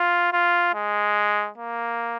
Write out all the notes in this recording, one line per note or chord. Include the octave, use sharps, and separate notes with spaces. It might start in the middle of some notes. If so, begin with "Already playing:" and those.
Already playing: F4
F4
G#3
A#3